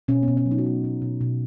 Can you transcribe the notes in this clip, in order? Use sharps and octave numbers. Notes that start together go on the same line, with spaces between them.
B2 C#4
B3
B2
C#4
F#3
D#4
F#4
F#3 D#4
B2
B2
B2